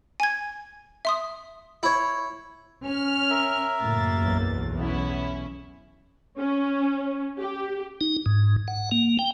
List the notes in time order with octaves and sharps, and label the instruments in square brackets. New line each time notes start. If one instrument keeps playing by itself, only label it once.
[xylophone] G#5 G#6
E5 C6 D#6
[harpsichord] E4 C#5
[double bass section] C#4 [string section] F6
[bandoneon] A#4 E5
[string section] F#2 A#3 A6 [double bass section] A2 C#3
[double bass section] B1 E2
[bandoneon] B3 [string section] C#4 E4
[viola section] C#4
G4
[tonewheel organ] D#4
G#2
F#5
A#3
G5